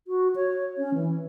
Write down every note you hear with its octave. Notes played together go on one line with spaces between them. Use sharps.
F#4
C#5
C#4
E3